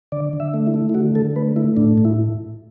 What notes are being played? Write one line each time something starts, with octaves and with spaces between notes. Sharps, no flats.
D3 D5
D3
E5
A3
E4
A3
E4
D3 F#4
D3 A4
A3 B4
A3 E4
A2 D4
A2
E4